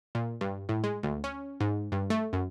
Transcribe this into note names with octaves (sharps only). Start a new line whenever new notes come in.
A#2
G2
A2
G#3
D2
C#4
G#2
G2
A3
F#2